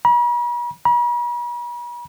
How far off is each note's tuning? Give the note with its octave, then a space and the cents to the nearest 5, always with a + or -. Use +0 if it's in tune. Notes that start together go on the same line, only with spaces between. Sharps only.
B5 -45
B5 -45